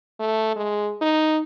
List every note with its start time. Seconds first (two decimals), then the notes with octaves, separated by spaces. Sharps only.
0.19 A3
0.56 G#3
1.02 D#4